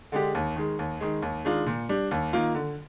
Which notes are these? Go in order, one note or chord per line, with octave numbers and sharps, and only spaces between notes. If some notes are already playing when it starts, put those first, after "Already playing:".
D3 G#3 D4 G4
D#2
D#3 G#3
D#2
D#3 G#3
D#2
D#3 G#3 D4 F4
A#2
G3 D4
D#2
D#3 A#3 F4
D3